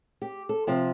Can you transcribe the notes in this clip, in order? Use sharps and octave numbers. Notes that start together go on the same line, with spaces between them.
G4
A4
C3 F3